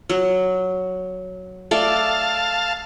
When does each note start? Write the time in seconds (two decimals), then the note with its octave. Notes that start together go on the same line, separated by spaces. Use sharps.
0.09 F#3
1.71 A3 D5 F5 A5